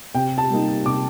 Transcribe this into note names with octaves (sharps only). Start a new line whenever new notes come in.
C3 G5
A5
G3 A#3 D#4
C3 D6